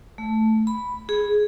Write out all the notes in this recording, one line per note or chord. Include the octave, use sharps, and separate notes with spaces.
A3
B5
G#4